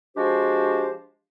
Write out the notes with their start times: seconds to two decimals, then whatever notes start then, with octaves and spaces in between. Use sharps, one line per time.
0.17 F3 G#3 D4 F#4 G4 C5